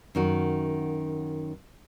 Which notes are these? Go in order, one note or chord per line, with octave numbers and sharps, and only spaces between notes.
F#2 D#3 F#4